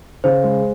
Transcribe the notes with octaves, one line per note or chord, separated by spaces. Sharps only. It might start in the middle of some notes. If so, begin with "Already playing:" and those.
C#3 C5
G#3